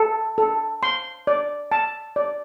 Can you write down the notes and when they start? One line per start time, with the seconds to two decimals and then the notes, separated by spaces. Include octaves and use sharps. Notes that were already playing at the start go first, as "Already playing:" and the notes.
Already playing: A4
0.38 A4
0.83 C6
1.27 D5
1.72 A5
2.16 D5